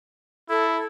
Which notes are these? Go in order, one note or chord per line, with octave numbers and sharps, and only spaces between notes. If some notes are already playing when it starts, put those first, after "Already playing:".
E4 A4